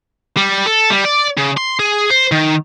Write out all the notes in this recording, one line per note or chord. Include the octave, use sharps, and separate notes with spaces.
G3
A4
G3
D5
C#3
C6
G#4
C5
D#3